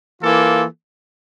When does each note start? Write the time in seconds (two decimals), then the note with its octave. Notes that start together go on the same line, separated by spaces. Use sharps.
0.22 E3 A#3 F4 A4